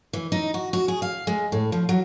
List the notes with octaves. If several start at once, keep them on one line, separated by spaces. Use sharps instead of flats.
E3
D#4
F#4
F#4
G#4
F5
G#3
A2
F3
F#3